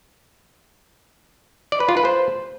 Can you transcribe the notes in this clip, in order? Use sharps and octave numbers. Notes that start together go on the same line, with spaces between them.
D5
B4
F4
B4
C5